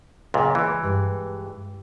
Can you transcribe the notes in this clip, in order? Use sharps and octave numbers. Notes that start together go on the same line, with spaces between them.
C#2 F#2 A#2
E3
G2 G3 G#3